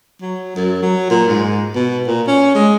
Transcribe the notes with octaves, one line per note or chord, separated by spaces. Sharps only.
F#3
F#2
F#3
A#2
G#2
B2
A#2
C#4
G#3